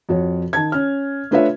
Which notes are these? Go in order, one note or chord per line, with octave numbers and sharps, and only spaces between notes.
F2 F#4 C#5
D#3 A5 G#6
C#4 F6
A3 D4 F4 B4 C#5 E5